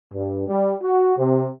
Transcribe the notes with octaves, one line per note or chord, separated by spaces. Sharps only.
G2
G3
F#4
C3